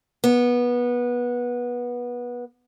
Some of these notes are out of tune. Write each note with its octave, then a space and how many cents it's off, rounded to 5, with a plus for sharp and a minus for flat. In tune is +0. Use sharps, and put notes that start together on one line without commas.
B3 -20